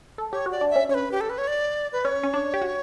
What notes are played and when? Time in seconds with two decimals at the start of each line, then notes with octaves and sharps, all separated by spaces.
0.18 A4
0.32 G4 C#5
0.46 F#4
0.52 D5
0.61 D4
0.70 E5
0.76 C#4
0.89 C#4 C#5
0.94 B4
1.12 G4
1.21 A4
1.30 B4
1.38 C#5
1.48 D5
1.93 B4
2.05 C#4 C#5
2.24 C#4
2.34 D4
2.54 G4
2.62 F#4